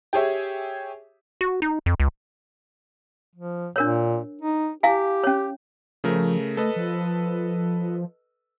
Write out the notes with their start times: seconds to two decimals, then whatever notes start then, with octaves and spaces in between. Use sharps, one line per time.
0.13 G4 G#4 C#5 E5
1.41 F#4
1.62 D#4
1.86 F2
2.00 C#2
3.35 F3
3.76 A#2 D4 A#4 C#5
4.41 D#4
4.83 E4 G4 F5 G#5
5.24 C#4 C#5
6.04 C#3 F3 A3 A#4
6.57 A3 A4 B4 D#5
6.76 F3